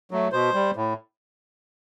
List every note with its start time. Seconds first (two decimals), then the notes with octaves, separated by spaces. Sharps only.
0.11 F#3 A3
0.32 B2 C5
0.54 G3
0.76 A2